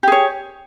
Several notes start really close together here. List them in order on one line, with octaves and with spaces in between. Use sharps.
G4 G#4 C#5